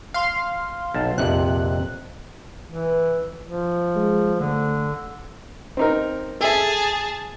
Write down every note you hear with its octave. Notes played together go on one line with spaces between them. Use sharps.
F5 C6
B1 A5
A#1 F2 C3 F#6
E3
F3
G#3
D3 A3
C4 D#4 A#4
G#4 A4 E5 A5